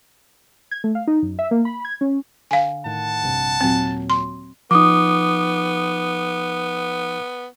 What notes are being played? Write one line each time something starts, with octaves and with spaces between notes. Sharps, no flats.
G#6
A3
F5
D#4
F#2
E5
A#3
B5
G#6
C#4
D3 F5 G#5
A2 D#3 F#5 A5
A#1 G2 C3
D#2 A#2 F#3 C4
C6
F3 B3 D#4 D6 D#6